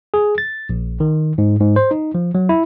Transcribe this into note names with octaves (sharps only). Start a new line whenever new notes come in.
G#4
A6
A#1
D#3
G#2
G#2
C5
D#4
F3
F#3
E4